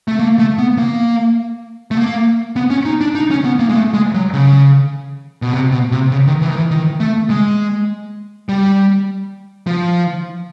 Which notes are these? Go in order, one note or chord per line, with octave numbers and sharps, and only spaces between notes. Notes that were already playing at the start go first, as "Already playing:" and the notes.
A3
A#3
A3
B3
A#3
A3
A#3
B3
C#4
D#4
D4
D#4
C#4
B3
A#3
G#3
A3
G#3
F#3
C#3
B2
C3
B2
C3
C#3
D#3
E3
D#3
E3
D#3
A3
G#3
G3
F3